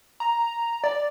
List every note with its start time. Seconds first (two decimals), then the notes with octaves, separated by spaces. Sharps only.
0.20 A#5
0.84 D5